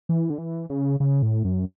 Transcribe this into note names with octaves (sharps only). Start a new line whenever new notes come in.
E3
D3
E3
C#3
C#3
A2
F#2